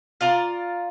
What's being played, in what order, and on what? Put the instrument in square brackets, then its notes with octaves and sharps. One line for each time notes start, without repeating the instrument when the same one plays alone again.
[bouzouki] F4 D5 A#5